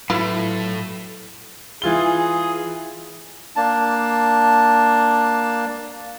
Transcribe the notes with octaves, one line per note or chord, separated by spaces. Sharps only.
A2 F#3 A3 E4 F4 B4
E3 F4 G#4 G7
A#3 D4 A5